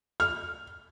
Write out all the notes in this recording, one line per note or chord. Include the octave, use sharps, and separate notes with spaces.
F6